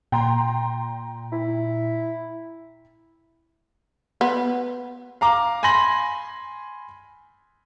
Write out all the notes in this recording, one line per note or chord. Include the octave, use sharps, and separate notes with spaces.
A#2 G5 A#5 C6
E4
B3
F5 A#5 D6
G#5 B5 C6 A#6 F#7